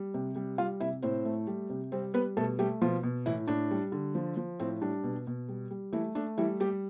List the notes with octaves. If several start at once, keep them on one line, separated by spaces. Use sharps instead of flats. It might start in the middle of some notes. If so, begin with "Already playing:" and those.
Already playing: G3
C3
G3
G3 F4 F5
C3 E4 E5
A2 C4 C5
A3
G3
C3
G3 C4 C5
G3 B3 B4
B2 A3 A4
G3 A3 G4
B2 F3 F4
B2
A2 E3 E4
A2 D4
G3
D3
F3
F3
A2 C4
G3 D4
B2
B2
G3
G3
E3 A3 E4
A3 D4
E3 G3 E4
G3 G4